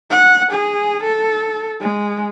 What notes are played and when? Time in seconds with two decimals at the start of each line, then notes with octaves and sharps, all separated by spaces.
0.11 F#5
0.52 G#4
1.03 A4
1.81 G#3